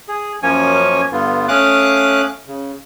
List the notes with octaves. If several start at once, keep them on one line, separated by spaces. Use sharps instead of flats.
G#4
F#2 F3 A#3 C#4 C#5 G#5
G2 D3 B3 F4
A3 C#4 F5 D6 D#6 F#6
C#3